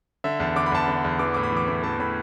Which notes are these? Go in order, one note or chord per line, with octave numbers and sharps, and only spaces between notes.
D3 E5
E2 A5
D3 D6
B5
E2 A5
D3 B5
E2
E3 D6
A2 D6
B5
E3 D6
A2 B5
E3 A5
A2 B5